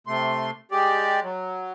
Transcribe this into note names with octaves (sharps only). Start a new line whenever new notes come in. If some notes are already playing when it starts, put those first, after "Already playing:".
C3 A3 C6
G#3 G4 D5
F#3